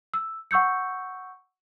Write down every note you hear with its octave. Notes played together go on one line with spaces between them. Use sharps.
E6
F#5 C#6 E6 G6 C#7